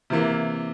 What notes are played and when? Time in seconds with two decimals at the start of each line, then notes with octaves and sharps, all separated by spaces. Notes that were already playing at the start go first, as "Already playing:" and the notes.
0.10 C3 E3 A#3